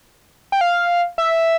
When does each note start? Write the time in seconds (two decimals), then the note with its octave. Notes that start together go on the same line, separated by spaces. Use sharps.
0.52 G5
0.61 F5
1.18 E5